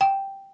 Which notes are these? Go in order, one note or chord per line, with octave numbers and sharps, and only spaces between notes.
G5